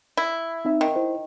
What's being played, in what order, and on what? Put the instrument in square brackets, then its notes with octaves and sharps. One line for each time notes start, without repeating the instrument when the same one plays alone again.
[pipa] E4
[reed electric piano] C4 D#4 E5
[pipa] D#3
[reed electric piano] E4 C5